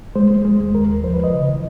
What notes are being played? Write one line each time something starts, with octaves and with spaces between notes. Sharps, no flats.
G#3 C5
G#3
G#3
D#2
D#2 A#4
D#2
F3 C5
B4
F3 D#5
C#3
E3